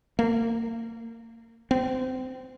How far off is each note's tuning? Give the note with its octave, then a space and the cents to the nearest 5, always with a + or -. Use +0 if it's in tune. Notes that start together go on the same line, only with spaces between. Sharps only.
A#3 -30
C4 -25